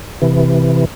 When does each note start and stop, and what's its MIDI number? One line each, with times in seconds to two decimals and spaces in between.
0.22 0.85 48
0.22 0.85 52